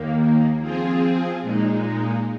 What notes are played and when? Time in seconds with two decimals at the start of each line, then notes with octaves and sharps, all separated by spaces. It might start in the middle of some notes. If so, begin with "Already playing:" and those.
Already playing: D#2 D#3 A#3
0.60 F3 C4 F4 G#4
1.42 A#2 G#3 D#4